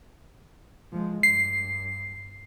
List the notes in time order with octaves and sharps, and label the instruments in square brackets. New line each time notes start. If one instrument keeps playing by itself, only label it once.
[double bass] F3 G#3
[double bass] G2 [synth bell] C7